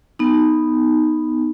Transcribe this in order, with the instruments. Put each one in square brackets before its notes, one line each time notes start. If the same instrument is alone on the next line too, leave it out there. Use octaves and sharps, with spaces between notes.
[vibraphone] B3 D#4